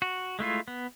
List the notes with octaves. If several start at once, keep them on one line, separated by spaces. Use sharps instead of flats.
F#4
G#3 A3 E4 F4
B3